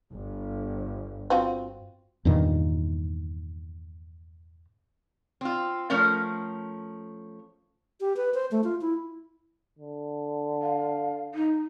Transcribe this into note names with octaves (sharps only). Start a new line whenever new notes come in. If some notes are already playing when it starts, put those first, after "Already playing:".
G1
C4 F4 F#4
E2 G2 A#2 D#3
C4 F4
F3 A3 C#4 A#4 F5
G4
B4
C5
A3
F4
E4
D3
F5
D#4